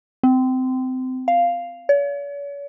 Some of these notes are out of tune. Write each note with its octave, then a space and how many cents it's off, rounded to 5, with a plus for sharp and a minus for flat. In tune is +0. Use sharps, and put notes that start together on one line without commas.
C4 -25
F5 -5
C#5 +45